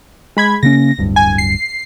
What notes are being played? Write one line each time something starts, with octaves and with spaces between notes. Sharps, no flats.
G#3 B5 G#6
C#3 A#3 C#4 A#6
D1 G2
G#5
C7